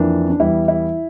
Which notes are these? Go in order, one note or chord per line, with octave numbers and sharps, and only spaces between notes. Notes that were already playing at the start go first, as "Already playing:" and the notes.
Already playing: F2 E3 A#3 D4
D4
E2 E3 G3 E4
E4